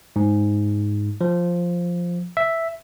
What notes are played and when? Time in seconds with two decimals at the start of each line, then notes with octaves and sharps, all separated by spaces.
0.16 G#2
1.21 F3
2.37 E5